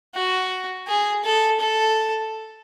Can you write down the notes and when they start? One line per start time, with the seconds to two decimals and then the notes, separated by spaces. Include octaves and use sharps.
0.15 F#4
0.88 G#4
1.24 A4
1.60 A4